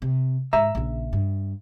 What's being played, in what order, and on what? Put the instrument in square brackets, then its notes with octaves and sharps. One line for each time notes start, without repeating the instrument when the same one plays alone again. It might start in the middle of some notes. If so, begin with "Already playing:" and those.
[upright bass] C3
[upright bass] G#2 [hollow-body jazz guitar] E5 A#5
[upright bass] A#1 C#3
G2